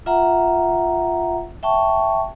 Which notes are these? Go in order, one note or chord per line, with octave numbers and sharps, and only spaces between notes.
F4 E5 F#5 A#5
E5 G5 A5 C#6